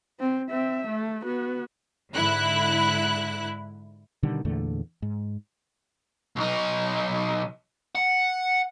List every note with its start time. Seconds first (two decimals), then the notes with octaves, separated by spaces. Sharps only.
0.20 C4
0.50 C4 E5
0.87 A3
1.24 B3 F#4
2.14 G#2 D3 E4 F#6
4.23 B2 D3 D#3 G3
4.45 E2 A#2 D3 A3
5.02 G#2
6.36 B1 D#4
7.95 F#5